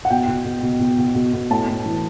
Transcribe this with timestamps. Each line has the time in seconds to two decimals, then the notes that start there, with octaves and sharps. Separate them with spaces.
0.05 F#5
0.10 B2 G5
0.28 B2
0.45 B2
0.63 B2
0.80 B2
0.98 B2
1.15 B2
1.33 B2
1.50 A2 A5
1.68 A2
1.86 E3